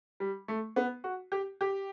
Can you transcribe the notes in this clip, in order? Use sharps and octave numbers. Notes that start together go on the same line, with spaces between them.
G3
A3
B3
F#4
G4
G4